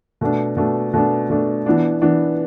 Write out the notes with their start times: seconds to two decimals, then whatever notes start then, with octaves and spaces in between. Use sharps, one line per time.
0.21 B2 A3 D4
0.57 B2 A3 D4
0.94 B2 A3 D4
1.30 B2 A3 D4
1.66 E3 B3 D4
2.02 E3 B3 D4